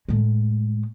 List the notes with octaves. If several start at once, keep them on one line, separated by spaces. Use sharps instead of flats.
A2 G#3